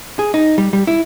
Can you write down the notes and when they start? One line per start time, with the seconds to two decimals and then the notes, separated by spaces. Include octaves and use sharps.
0.19 G#4
0.34 D#4
0.58 G3
0.73 G3
0.87 E4